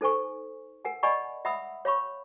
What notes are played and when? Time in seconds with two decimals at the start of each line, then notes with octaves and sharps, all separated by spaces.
0.01 D#4 A4 C5 G#5 C#6
0.85 A#4 F#5 G#5
1.03 D5 D#5 F#5 G#5 B5 C#6
1.45 E5 F#5 B5 D#6 E6
1.85 C#5 F5 B5 C#6